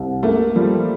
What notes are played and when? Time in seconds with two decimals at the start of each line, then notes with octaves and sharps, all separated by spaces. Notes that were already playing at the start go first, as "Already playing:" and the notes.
Already playing: C2
0.23 A3 A#3
0.56 F3 G3